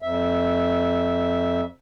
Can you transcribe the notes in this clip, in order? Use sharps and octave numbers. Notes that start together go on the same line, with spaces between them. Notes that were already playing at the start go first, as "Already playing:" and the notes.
F2 E5